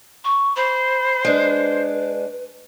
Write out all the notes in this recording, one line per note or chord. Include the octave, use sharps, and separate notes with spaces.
C#6
C5 B5
G#3 D4 B4